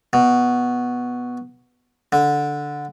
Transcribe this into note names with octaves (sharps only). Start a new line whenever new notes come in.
B2
D3